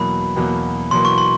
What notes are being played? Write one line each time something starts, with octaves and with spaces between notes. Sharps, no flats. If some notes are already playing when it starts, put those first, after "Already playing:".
Already playing: E2 B2 F#3 A#3 B5
E2 B2 F#3 A#3
E2 B2 F#3 A#3 C6
C#6
C6